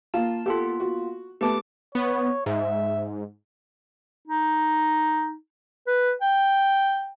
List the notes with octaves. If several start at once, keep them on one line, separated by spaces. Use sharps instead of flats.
A#3 F4 A5
A#3 B3 F4 G4 A4
F#4
A3 B3 G4 A5 D6
B3 C#5
G#2 E5
D#4
B4
G5